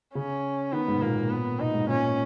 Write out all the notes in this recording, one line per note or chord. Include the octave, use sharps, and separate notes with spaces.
C#3 C#4
D#3 B3
G#2
B2
A#2 A#3
B3
B2 D#4
G#2
A#2 C#4